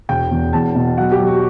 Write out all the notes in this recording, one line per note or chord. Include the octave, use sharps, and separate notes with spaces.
E1 G5
E2
E2 A5
B2
F#3 F#5
G4
F#3
F#4